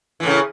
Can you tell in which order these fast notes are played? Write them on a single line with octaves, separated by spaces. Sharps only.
E3 A2 C#3